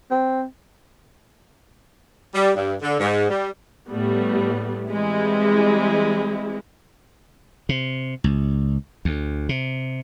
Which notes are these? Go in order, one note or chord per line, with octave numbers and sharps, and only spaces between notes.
C4
G3
G2
D3
G#2
G3
A2 G3 A3 B3
E3 G3 G#3 C4 E4
C3
C#2
D2
C3